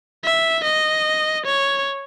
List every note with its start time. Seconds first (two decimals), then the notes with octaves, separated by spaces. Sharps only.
0.24 E5
0.64 D#5
1.46 C#5